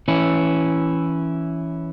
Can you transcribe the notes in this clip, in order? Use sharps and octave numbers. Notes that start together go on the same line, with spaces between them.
E3 C#4 E4